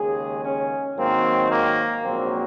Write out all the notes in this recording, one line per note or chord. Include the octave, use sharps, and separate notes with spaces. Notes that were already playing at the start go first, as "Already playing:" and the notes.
Already playing: D#2 C#3 G#3 G#4
C#4
G#2 D#3 F#3 A#3 C4
A#3
A#1 G#2 F#3 A#3 C4